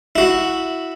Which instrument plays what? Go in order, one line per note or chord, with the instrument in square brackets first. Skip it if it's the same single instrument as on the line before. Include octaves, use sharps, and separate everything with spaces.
[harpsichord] E4 F#4